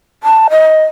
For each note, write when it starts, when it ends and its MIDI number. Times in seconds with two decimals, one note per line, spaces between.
0.23 0.48 81
0.50 0.85 75